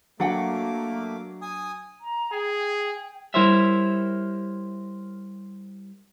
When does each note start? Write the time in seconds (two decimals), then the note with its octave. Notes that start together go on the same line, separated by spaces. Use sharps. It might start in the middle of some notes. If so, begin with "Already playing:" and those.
0.20 F#3 A3 A#3 D4 F#5 G5 D6
1.42 G#5 D#6
2.00 A#5
2.32 G#4 G5
3.34 G3 E4 A#4 C5 C#5 E5